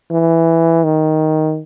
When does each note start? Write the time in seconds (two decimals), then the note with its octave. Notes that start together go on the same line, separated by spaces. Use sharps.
0.11 E3
0.84 D#3